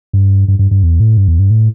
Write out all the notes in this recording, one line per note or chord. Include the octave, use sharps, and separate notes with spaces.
G2
G2
G2
G2
E2
A2
G2
E2
G2
A2